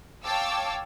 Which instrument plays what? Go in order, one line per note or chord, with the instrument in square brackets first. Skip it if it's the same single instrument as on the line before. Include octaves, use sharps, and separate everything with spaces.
[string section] C#5 F5 G5 A5 D6 E6